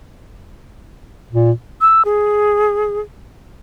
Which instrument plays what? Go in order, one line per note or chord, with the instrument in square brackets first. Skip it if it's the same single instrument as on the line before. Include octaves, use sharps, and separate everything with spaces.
[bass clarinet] A#2
[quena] E6
G#4